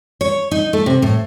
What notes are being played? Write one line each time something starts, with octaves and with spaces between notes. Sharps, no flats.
C#5
D#4
A3
C3
A2